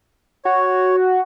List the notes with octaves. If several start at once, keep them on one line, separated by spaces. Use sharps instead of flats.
F#4 C#5